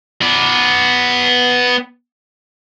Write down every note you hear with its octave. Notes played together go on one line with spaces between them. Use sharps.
B3 D5